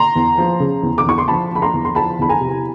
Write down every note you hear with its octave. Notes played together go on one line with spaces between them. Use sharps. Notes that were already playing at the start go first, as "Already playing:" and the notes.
Already playing: A#5 C6
E2
F3
C#3
E2
D6
E2 C#6
C6
F3 A5 B5
F3 B5
A#5 C6
E2
C6
F3 A5 B5
E2 B5
G#5 A#5
C3